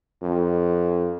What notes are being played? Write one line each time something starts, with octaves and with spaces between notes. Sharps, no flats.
F2